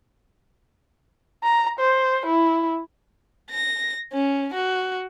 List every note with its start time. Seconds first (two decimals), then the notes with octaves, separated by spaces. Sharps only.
1.44 A#5
1.80 C5
2.26 E4
3.51 A#6
4.13 C#4
4.54 F#4